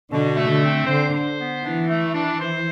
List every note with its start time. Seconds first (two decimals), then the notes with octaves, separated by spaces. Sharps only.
0.11 B2 D3
0.36 A3
0.49 D3
0.63 C4
0.87 D3 C5
1.13 C5
1.38 B3
1.63 E3 D4
1.88 A3
2.14 D4
2.40 C5